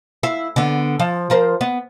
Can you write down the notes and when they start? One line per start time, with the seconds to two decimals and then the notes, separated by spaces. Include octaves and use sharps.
0.23 E4 F5
0.56 D3 B3
0.99 F3
1.30 F3 A#4 C5
1.61 B3